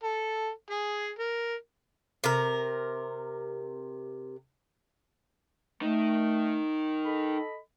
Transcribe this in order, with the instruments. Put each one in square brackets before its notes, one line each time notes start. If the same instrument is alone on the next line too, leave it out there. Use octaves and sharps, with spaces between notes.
[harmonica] A4
G#4
A#4
[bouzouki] C3 A#4
[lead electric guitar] D#3 D#4 [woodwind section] A3
[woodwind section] A4 D#5 B5